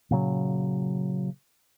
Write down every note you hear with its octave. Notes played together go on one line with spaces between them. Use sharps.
A#2 C#3 F#3